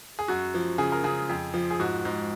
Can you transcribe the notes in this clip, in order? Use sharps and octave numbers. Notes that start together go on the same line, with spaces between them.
G#4
F#2 F#4
F3
C#3 G#4
A#4
C#3 G#4
F2
F3
G#4
G#2 F#4
G#2